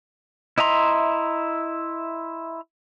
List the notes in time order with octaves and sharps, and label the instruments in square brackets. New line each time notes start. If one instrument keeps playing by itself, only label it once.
[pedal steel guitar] E4 D#5 E5 A#5 C6